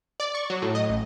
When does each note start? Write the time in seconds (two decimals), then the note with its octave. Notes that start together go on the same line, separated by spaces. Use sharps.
0.20 D5
0.35 C#6
0.50 F#3
0.62 A2
0.75 D#5
0.90 A1